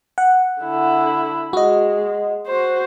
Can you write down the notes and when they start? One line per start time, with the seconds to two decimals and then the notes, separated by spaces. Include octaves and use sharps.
0.18 F#5
0.62 D3 E4
1.53 G#3 F#4 D#5
2.47 F#4 C5